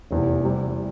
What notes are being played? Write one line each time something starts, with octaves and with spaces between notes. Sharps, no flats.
F1 E2 C3
C3 G3